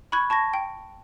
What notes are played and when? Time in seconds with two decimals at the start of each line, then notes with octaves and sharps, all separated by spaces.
0.12 B5 C#6 F#6 G#6
0.30 A5 C#6 G#6 A#6
0.54 G5